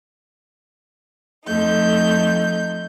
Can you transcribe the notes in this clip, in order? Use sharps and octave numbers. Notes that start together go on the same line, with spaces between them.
F2 A3 D#4 G6